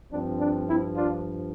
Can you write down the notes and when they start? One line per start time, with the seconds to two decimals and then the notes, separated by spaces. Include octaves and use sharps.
0.11 G2 F3 C4 D4
0.40 D4
0.68 C4 E4
0.96 D4 F4